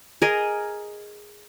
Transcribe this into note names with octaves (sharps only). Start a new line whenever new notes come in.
G#4 A#4 D#5